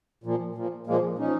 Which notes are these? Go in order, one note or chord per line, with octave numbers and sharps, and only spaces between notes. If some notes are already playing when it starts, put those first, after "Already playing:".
A#2 F3
A#2 F3
A#2 F3 G#3 A#3
A#2 F3 C#4 D#4